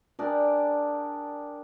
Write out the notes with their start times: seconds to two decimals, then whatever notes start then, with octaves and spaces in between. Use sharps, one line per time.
0.19 D4 G4 G#4 A#4